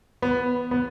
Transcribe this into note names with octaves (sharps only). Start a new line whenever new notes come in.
B3
B3